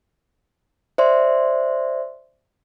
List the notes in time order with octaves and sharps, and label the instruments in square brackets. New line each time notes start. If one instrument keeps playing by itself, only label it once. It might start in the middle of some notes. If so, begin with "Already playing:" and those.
[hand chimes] C5 D5 E5 C6